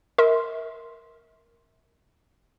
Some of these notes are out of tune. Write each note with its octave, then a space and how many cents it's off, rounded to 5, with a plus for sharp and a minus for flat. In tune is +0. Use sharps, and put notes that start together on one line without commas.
A#4 +0 E5 -35 C6 +0